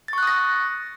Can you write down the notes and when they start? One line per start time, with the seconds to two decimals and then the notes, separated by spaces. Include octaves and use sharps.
0.08 A6
0.13 C#6
0.18 F#6
0.23 D#6
0.27 A#6